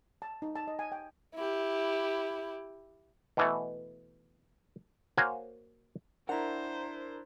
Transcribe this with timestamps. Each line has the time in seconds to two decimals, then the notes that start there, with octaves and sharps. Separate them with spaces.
0.22 A5
0.42 D#4
0.55 A5
0.68 D#5
0.79 G#5
0.92 G5
1.35 E4 G4
3.37 B2 E3 A3
5.17 A#3 F#4 C5 C#5 F5 G#5
6.29 D4 E4 A#4 C5 F#5 A#5